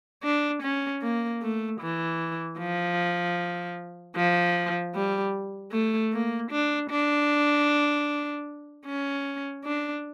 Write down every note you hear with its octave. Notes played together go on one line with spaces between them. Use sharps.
D4
C#4
A#3
A3
E3
F3
F3
G3
A3
A#3
D4
D4
C#4
D4